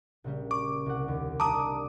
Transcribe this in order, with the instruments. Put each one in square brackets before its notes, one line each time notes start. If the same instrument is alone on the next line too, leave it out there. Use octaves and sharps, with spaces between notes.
[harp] A#1 C#3 G3
[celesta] C#6 [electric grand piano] D6
[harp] C2 F#5
D#2
[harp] G3 D4 [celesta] A5 A#5 [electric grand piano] D6 D#6